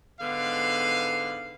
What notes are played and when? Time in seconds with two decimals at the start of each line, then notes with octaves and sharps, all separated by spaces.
0.20 G#2 D3 B3 F5